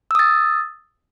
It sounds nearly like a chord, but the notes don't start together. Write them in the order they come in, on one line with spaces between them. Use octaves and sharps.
E6 D#6 A6